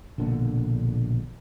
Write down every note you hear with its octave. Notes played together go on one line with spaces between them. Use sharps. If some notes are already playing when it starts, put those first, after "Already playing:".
A#1 B2 D3 A#3